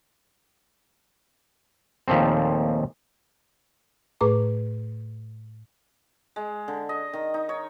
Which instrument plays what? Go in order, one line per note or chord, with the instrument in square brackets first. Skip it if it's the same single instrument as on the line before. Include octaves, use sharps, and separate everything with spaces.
[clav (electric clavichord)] D#2 A#2 F3 A3 C4
[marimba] A2 A3 G#4 B4 A#5 D6
[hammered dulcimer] G#3
D3
D#5
D#3
D#4
C#5